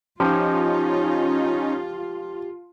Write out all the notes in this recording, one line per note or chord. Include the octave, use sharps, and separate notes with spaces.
F3 C#4 D#4 F4 G4